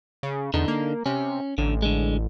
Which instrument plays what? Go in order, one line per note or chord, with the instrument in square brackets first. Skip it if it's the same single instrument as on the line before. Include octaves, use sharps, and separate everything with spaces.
[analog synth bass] C#3
[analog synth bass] E2 [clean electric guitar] D3 D#4
[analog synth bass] A#3
[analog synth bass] C3 [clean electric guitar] C#4
[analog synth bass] A1 [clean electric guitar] D3
[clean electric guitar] D3 G#3